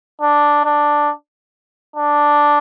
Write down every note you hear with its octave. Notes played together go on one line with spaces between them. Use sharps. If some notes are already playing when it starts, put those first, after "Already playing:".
D4
D4
D4